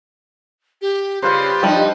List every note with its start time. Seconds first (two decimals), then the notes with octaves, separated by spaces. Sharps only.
0.82 G4
1.22 C#3 G3 C#4 F4 G4 B4 C5
1.63 G2 F3 G3 D#4